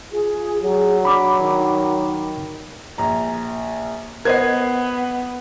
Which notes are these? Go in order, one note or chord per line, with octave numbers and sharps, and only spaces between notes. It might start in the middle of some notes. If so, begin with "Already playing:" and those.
F4 G#4
F#3 G#4
D4 B5 D6
D#3
A#1 A#5
B3 A#4 C5 D#5 G#6 C7